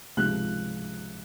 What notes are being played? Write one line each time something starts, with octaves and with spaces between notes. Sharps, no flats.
C#2 C3 F3 F#6